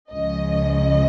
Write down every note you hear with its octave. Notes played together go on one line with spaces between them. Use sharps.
C#2 C#3 F3 D#5